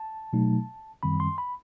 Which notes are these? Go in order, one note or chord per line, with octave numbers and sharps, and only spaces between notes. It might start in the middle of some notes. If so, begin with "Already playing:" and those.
Already playing: A5
B2 F#3 A3 D#4
F#2 D#3 G3 C4 B5
C6
B5